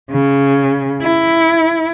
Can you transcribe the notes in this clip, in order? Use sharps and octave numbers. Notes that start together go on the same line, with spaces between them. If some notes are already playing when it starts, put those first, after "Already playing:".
C#3
E4